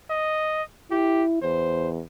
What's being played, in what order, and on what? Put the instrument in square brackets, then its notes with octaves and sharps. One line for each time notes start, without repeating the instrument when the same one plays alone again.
[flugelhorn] D#5
[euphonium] E4 [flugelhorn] G4
[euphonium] E2 [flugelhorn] C5